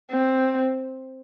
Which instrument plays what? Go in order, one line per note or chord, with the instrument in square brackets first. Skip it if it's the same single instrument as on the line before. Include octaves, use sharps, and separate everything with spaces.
[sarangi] C4